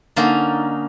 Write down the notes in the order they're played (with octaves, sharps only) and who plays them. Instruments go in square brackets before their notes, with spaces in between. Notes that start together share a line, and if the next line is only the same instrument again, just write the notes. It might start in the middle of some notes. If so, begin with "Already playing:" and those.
[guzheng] D3 A#3 C#4 D#4